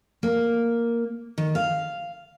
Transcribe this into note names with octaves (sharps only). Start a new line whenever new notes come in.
A#3
D#3
F5